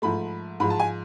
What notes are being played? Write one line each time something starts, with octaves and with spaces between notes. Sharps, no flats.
G#2 F3 A3 B5
G#2 F3 G#3 B5
A5
G#5